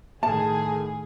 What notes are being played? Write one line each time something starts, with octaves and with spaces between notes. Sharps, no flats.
A2 D#3 G#4 A5